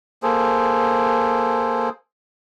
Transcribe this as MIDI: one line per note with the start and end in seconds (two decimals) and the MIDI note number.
0.23 1.89 58
0.23 1.89 68
0.23 1.89 69
0.23 1.89 72